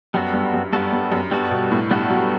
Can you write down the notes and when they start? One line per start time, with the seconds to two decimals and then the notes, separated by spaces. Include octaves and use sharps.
0.14 F#2 G3 B3 F#4 A4
0.34 G2
0.54 F#2
0.73 G2 G3 B3 F#4 A4
0.93 G2
1.12 F#2
1.31 G2 G3 B3 F#4 A4
1.51 B2
1.71 A2
1.91 G2 G3 B3 F#4 A4
2.10 F#3